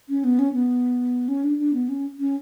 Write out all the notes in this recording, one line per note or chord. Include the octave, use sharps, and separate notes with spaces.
C#4
B3
C#4
B3
C#4
D4
D4
B3
C#4
C#4